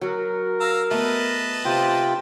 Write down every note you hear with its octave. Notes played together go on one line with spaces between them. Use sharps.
F#3 F#4 A#4
F5 A#5 E6
A3 B3 B4 D#5 A5
C3 F4 C5 G5